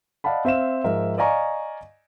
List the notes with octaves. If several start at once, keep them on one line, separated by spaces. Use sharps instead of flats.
D5 D#5 F5 F#5 A5 B5
C4 E5 F5 E7
G#2 F3 A#4 E5
D5 D#5 F5 G#5 A#5 C#6